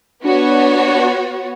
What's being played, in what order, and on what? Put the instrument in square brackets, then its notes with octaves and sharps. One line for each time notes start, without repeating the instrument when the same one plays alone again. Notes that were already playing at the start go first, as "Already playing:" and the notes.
[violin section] B3 F#4 C#5 [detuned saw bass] D4